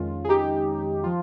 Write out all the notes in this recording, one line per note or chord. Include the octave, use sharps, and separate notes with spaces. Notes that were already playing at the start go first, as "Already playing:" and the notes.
Already playing: F2 D#3 G#3 C#4 F4
G#4
D#4 G4
F3 F4